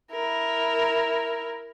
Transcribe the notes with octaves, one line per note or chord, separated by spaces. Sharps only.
E4 A#4